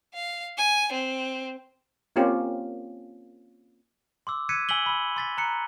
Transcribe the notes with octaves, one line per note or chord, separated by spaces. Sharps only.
F5
G#5
C4
A#3 C4 C#4 F4 G4
C6 D6 E6
E6 F#6 G#6 B6 C#7 D#7
G#5 E6 B6 F#7 G7
B5 E6
C6 A6 B6
A#5 F#6 C#7